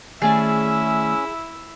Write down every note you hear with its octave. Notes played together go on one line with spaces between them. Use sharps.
D#3 A3 C#4 E4 G#4 D5 E5